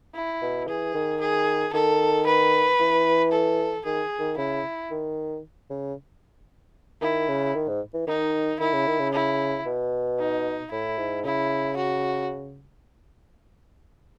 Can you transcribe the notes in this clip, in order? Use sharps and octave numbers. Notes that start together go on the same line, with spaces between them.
E4
B2
E3 G#4
D#3
G#4
D#3 A4
B4
E3
A4
D#3 G#4
D#3
C#3 E4
D#3
C#3
D#3 E4
C#3
D#3
G#2
E3
D#3 D#4
D#3 E4
C#3
D#3
C#3
E4
B2
D#4
A2 E4
G#2
C#3 E4
F#4